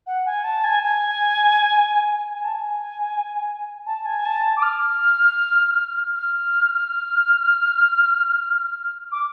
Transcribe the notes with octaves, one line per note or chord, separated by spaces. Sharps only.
F#5
G#5
A5
G#5
G#5
G#5
A5
G#5
A5
G#5
A5
D6
F6
F6
D6